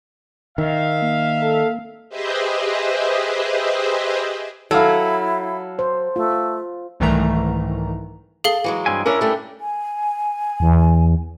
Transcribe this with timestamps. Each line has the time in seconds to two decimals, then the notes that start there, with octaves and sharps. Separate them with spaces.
0.58 D#3 E5 F5
1.02 A#3
1.42 A4
2.09 G4 G#4 B4 C5 D#5 E5
4.71 F#3 E4 A4 F5
5.79 C5
6.16 A3 F4
7.00 C2 G#2 D#3 E3 A3 A#5
8.44 G#4 A4 F5 G7
8.64 E3 F#3 G#3
8.86 G2 C4 G#5
9.06 C#4 D4 E4 A#4 C#5
9.21 G3 A3
9.61 G#5
10.60 E2